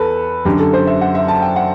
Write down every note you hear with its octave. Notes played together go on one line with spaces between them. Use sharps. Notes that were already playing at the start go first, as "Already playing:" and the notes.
Already playing: E2 A4 B4
F#2 D3 G4
A4
C5
E5
F#5
E5
A5
G5
F#5